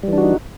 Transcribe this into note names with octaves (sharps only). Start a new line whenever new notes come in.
E3 G3 D4 D#4 F#4